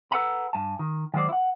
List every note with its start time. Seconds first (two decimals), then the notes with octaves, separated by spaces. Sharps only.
0.11 A4 B4 F#5 G#5 A#5 B5
0.53 G2 G#5 A5
0.79 D#3
1.14 D#3 F#3 G#3 C5 D5
1.29 E4 F#5